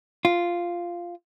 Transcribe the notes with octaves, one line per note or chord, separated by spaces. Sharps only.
F4